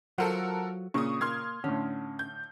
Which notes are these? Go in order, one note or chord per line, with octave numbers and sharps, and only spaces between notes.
F#3 F4 A4 A#4 C5 F#5
A#2 C#3 C#6 D#6
A#3 C6 F6 G#6
A2 D3 C#4
G6